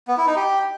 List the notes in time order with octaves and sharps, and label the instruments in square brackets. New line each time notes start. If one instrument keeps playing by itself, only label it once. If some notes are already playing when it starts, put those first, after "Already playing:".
[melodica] B3
E4
D#4
G4